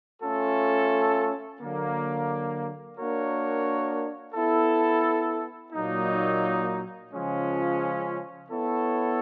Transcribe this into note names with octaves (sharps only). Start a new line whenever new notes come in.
A3 C#4 F4 A4
D3 F#3 A#3
A#3 D4 F#4 A#4 C#5
B3 E4 A4
A#2 F#3 A#3 D#4
C#3 F3 G#3 C#4 F4
B3 E4 A4 C#5